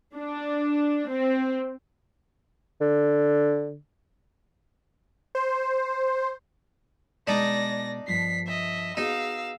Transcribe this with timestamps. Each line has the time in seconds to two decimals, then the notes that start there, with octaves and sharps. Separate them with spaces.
0.16 D4
1.09 C4
2.81 D3
5.35 C5
7.27 B2 G#3 D4 D#4 D5 D#5 A#6
8.08 G2 F3 B6 C7
8.46 D#5 E5
8.97 B3 D#4 F#4 G#4 F5 E6